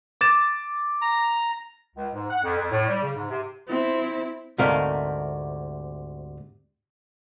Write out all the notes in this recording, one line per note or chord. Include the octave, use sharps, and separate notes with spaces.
D6 A6 E7
A#5
C#2
G#2
F#5
F2
F2
A2
G3
C#3
G#2
C3
C4 E4
D2 G#2 C3 A3 A#4 F5